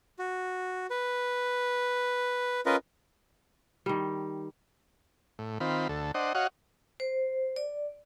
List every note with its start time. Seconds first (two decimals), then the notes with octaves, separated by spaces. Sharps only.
0.19 F#4
0.90 B4
2.66 C#4 F4 A#4 B4 D#5
3.86 D#3 G3
5.39 A2
5.60 D#3 C4 F4 B5
5.89 D2 A4
6.14 D4 C5 D#5 F#5
6.35 F#4 C#5 D#5 F5 F#5
7.00 C5
7.56 D5